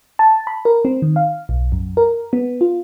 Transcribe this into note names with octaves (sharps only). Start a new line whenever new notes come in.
A5
B5
A#4
C4
D#3
F5
B1
F#2
A#4
B3
F4